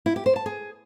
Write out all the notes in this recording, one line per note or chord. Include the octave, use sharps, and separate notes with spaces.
E4
G4
C5
A5
G#4